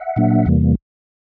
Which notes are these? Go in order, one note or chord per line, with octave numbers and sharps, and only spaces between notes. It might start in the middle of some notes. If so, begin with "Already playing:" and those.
Already playing: E5 F#5
A#2 F#3 A#3 D4
E2 C3 E3 G3 A#3